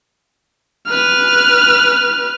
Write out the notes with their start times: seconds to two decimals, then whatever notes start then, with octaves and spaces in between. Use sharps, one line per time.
0.87 B4 F6